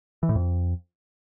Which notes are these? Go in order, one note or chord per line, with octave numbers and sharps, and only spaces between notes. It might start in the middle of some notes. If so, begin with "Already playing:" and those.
E3
A2
F2